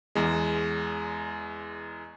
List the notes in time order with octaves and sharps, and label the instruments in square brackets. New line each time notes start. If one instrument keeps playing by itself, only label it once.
[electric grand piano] E2 G#3